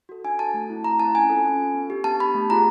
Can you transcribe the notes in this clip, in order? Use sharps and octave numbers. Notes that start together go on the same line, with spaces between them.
F#4 A4
D4 G#5
F#4 A4 A5
A3
C4 E4
A3 A#5
E4 A5
C4
C#4 G#5
F4 A4
C#4
F4 A4
B3
D4 G4
B3 A5
D4 G4 B5
A3
C4 F4 G#4 A#5